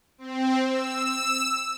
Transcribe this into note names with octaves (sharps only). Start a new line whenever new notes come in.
C4
E6